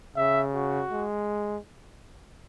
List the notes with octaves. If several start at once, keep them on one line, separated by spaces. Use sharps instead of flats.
C#3 E5
F#4
G#3